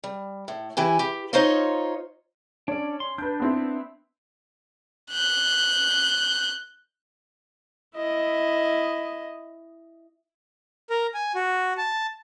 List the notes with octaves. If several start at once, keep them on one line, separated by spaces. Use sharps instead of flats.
G3
A2
E3 E4 G4 G#5
G4
D#4 F4 C5 C#5 D#5 F5
C#4 D4 C#5 D5
C6
D4 B4 G6
B3 C4 E4
F#6 G6
E4 D#5
A#4
G#5
F#4
A5